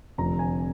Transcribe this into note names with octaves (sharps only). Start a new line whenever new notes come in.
F1 F2 D3 A#5
G#5